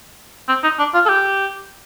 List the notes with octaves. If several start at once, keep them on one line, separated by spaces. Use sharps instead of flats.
C4
D#4
D4
F4
A4
G4